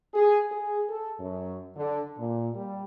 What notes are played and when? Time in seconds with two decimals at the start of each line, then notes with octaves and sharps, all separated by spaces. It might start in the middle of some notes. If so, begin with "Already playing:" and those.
0.14 G#4
0.52 G#4
0.89 A4
1.19 F#2
1.76 D3
2.18 A#2
2.54 G3